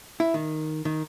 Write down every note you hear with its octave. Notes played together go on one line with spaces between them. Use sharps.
E4
D#3
D#3